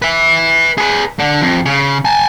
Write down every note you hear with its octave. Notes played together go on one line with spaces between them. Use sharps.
B4 E5
G#4 B4
D3
F2
C#3
G#5 A5